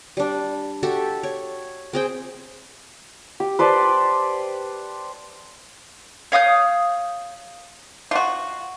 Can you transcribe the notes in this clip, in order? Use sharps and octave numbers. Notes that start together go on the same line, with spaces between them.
G3 D4
F#4 G4 A4 E5
C#5
C4 G#4 G5
G4
B4 C5 D5 A5
C#5 F5 D#6 G6
F4 F#4